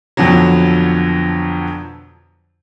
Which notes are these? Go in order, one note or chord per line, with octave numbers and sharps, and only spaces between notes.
F2 B2 D3 F3 F#3